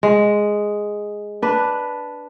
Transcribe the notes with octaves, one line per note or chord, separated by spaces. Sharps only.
G#3
D4 B4